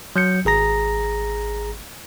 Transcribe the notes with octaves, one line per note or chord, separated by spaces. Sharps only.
F#3 G6 C#7
G#1 G#4 A#5 A#6